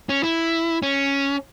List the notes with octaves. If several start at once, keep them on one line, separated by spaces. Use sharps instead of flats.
C#4
E4
C#4